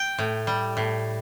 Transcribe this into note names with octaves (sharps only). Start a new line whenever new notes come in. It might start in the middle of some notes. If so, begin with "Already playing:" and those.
Already playing: G5
A2
G3
A2